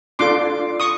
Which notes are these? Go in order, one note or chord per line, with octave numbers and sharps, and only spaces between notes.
D4 F4 A4 C6 D6
C#6 D#6